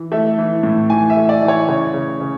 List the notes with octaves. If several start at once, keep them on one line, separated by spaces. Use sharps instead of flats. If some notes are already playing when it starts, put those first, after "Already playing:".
Already playing: E3
A3 E5
E3
A2
E3 G#5
E5
A3
D5
E3
C#5
C#3 C#5
C#3
C#3